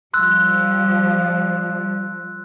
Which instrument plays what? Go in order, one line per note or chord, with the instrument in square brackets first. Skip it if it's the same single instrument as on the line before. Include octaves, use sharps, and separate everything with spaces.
[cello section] F3 G3 [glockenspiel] C6 E6 F#6